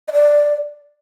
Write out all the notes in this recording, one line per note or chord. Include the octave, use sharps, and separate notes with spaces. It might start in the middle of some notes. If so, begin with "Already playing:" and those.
D#5
D5